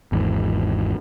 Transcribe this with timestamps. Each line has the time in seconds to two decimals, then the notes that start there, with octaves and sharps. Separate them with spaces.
0.12 G#1 E2 G#2